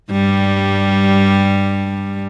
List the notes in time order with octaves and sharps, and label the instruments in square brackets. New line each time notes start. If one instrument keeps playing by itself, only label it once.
[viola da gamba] G2 G3